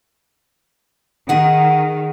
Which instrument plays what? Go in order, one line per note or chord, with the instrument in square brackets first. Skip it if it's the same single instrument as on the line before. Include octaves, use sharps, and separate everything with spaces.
[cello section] D#3 [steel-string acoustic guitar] G#4 F#5